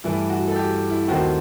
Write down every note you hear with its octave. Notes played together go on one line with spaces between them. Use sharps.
G2 E3 A3 E4
F#4
A4
G4
E4
D#2 D#3 A3 C4 F#4